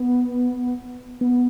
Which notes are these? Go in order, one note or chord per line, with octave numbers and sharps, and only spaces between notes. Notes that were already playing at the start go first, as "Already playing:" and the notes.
Already playing: B3
B3